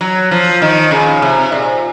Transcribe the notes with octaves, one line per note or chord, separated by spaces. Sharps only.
F#3
F3
D#3
C#3
C3
A#2